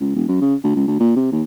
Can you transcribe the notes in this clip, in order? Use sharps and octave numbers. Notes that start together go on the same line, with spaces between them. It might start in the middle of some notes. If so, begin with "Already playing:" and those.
C#2
E1
F#2
C#3
D2
C#2
D2
A#2
C3
D#2